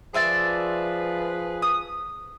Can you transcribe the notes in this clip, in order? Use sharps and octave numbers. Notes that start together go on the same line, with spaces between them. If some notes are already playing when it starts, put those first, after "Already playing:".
F3 G#4 B4 D5 E5 C6
D#6